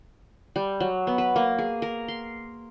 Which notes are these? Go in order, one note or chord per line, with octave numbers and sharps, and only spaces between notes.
G3
F#3
B3
B4
A#3
G#4
A#4
C6